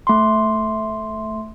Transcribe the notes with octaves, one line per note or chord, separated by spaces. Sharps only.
A3 C6